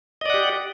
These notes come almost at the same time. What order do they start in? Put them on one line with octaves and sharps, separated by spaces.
D#5 D5 F#5 G4